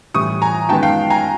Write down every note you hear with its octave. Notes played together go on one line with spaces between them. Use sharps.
A2 E3 G3 C#6 D#6
G#5 A#5
F#2 D#3 G#3 B3 G5 A5
F5 G5
G#5 A#5